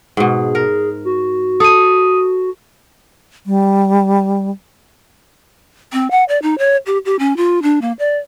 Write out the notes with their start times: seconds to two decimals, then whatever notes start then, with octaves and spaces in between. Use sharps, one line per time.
0.17 G#2 B2 G#4
0.55 A#4
1.05 F#4
1.60 A4 D#6 D#7
3.46 G3
5.93 C4
6.11 F#5
6.29 D5
6.42 D#4
6.58 C#5
6.86 G4
7.05 G4
7.19 C#4
7.37 F4
7.62 D4
7.81 A#3
7.99 D5